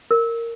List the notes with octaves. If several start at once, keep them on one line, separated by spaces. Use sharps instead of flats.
A#4